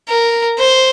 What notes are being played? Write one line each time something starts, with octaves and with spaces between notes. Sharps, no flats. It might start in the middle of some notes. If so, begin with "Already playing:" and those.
A#4
C5